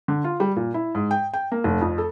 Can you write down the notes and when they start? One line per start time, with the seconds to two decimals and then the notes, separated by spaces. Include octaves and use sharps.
0.08 D3
0.24 F4
0.40 G3
0.56 A#2
0.74 E4
0.95 G#2
1.11 G5
1.34 G5
1.52 A#3
1.64 F1
1.81 F2
1.98 A4